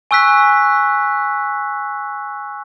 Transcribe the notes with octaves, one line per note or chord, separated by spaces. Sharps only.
G#5 C#6 E6 F#6 B6